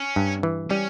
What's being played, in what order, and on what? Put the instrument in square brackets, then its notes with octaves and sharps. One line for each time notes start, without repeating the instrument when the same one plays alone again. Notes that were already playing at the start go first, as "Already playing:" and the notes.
Already playing: [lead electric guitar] C#4
[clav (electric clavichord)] G2
E3
[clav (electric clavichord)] G3 [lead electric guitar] C#4